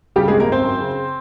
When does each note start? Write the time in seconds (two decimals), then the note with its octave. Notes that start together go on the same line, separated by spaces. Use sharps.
0.16 C#3 G3 G4
0.28 G#3 G#4
0.32 G#1
0.40 A#3 A#4
0.49 G#1 C4 C5
0.64 F#2
0.80 C#3